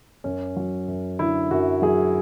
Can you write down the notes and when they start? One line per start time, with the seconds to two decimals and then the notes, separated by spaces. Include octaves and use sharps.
0.24 F#2 C#4
0.56 F#3
0.88 F#2
1.19 D3 E4
1.51 F#2 F#4
1.82 F#3 G#4